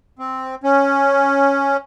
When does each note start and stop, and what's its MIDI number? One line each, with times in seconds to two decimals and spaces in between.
0.19 0.55 60
0.64 1.77 61